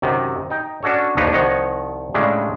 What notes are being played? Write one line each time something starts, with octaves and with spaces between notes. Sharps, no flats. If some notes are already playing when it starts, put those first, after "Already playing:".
F#2 C3 D#3
D#4 G5
C#4 D4 F#4 A4 C#5
D#2 F3 D4 D#4 B4 C#5
C2 D#3 F3 C#5 D#5 F#5
A2 C#3 G3 G#3 D4